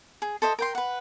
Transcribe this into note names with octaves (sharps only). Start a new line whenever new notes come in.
G#4
A4 C5 D#5 E5
A#4 G5 C6
B4 F#5